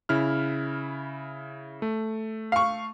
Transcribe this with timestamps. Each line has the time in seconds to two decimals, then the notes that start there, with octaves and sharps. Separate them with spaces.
0.09 C#3 E4 F6
1.82 A3
2.52 F5 C#6